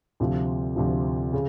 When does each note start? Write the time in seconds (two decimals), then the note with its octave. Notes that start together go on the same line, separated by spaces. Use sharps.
0.20 D2 C3 F3
0.76 D2 C3 F3
1.33 C#3